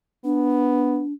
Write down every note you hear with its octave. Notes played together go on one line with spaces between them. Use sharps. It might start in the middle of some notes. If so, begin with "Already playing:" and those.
B3 D4